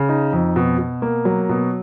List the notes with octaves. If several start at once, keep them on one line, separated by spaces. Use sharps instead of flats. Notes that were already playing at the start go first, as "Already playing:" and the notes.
Already playing: C#3
D#4
F2
B2
B2
A#3
F#3
B2